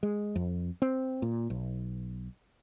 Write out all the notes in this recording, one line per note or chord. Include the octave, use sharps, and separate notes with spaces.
G#3
F2
C4
A#2
B1